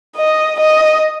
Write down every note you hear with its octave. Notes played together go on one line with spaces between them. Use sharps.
D#5
D#5